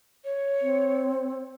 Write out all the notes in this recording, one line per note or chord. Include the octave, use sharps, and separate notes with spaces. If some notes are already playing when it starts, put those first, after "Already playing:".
C#5
C4